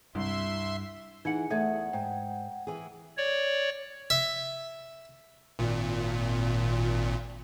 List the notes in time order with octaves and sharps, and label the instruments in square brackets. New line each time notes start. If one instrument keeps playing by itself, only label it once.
[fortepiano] C2 [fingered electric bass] G2 [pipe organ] E5 C6
[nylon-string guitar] E3 F#5 [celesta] D#4 C#7 [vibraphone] E4 G#4 G#5
[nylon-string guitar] E2 A3 G#4 [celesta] A4 E5 G#6 [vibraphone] F#5
[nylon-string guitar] G#2 [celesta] G5
[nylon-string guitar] E3 G#4
[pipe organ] C#5 D5
[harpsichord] E5
[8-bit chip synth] G#1 A#2